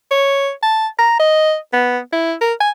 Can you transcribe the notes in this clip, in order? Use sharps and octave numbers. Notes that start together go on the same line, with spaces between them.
C#5
A5
A#5
D#5
B3
E4
A#4
G#5